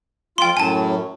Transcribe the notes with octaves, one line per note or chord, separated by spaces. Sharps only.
F2 F4 G5 C6
F#2 A2 F#3 G#5 A5